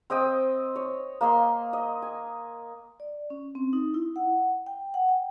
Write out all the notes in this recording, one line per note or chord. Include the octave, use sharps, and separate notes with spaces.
C4 D#5 G5 D#6
C#5
A#3 D#5 C6
D#5
G#5
D5
C#4
C4
D#4
E4
F#5
G5
F#5
G5